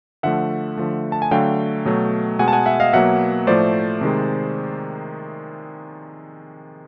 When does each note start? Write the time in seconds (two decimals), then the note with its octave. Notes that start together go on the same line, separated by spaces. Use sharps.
0.23 D3 F3 A3 E5 F#5
0.77 D3 F3 A3
1.12 A5
1.22 G#5
1.31 D3 F#3 A3 F5 G5
1.85 B2 F#3 A3
2.39 B2 G#3 F#5 G#5
2.48 A5
2.53 F#5 G#5
2.66 E5 F#5
2.80 D#5 F5
2.93 B2 F#3 A#3 E5 F#5
3.47 A2 F3 A3 C5 D5
4.01 C3 D#3 G#3